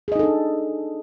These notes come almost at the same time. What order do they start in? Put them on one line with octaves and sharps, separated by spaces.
G#4 D#5 D#4 A4 D4